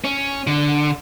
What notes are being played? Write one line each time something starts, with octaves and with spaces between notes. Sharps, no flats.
C#4
D3